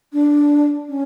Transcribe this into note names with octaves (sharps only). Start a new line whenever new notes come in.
D4
C#4